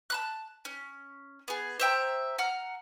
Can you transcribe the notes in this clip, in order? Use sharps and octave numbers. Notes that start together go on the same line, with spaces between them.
A5 B5 F#6
C#4
B3 G#4
C5 E5 G5 A#5
F#5 A#5 F6